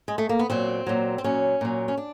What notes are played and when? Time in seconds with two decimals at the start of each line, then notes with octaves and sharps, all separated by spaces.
0.08 G#3
0.18 A3
0.29 A#3
0.39 B3
0.50 A#2 F#3 C4
0.87 A#2 F#3
1.18 C4
1.24 A#2 F#3 C#4
1.61 A#2 F#3
1.88 C#4
1.98 D4